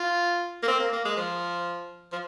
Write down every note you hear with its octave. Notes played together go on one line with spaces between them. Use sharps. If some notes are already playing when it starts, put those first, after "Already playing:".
Already playing: F4
A#3
C4
A#3
A#3
G#3
F3
F3